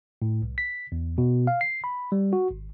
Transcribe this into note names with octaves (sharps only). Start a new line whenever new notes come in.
A2
C2
B6
E2
B2
F5
C7
B5
G3
F#4
G#1